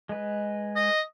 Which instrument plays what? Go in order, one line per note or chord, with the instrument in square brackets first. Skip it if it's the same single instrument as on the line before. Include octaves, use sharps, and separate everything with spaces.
[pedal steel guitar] G#3 B4
[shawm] D#5